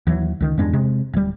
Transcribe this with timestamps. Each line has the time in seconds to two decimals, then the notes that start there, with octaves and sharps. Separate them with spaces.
0.07 D#2 E3 F#3
0.40 C#2 D#3
0.58 E2 G2 G#3 D4
0.73 C3 G#3
1.13 D1 G3